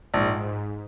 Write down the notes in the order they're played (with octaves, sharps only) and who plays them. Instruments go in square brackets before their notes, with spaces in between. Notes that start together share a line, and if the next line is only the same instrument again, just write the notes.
[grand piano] A#1 [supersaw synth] G#2